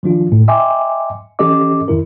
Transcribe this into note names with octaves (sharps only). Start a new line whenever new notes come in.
D#3 F3 D4 F4
A2
D#5 E5 G5 G#5 C6 D6
E3 C#4 G4 A4 D#5 D6
F2 D#3 E4 A#4